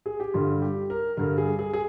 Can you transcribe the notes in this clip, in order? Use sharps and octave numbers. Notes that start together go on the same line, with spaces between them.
G#4
G4
G2 D3 F4
G4
A#4
G2 D3 A#4
G#4
G#4
G#4